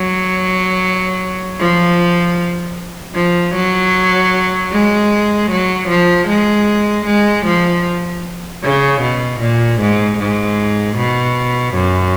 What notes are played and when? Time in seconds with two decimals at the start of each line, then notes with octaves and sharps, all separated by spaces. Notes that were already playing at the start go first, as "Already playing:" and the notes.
Already playing: F#3
1.60 F3
3.15 F3
3.56 F#3
4.72 G#3
5.51 F#3
5.89 F3
6.29 G#3
7.06 G#3
7.46 F3
8.63 C#3
9.01 B2
9.40 A#2
9.81 G#2
10.19 G#2
10.97 B2
11.75 F#2